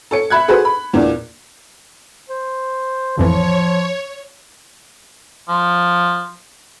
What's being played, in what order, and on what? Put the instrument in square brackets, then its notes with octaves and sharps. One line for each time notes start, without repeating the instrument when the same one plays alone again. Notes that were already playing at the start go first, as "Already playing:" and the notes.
[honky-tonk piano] A4 C#5 C#7
E5 B5 F#6 G#6
F#4 G#4 A4 B4 C5
B5
E2 A#2 D4
[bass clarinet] C5
[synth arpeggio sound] A1 F2 E3 [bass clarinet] F3 [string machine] C#5
[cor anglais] F3